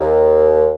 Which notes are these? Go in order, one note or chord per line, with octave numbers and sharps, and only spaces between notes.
D#2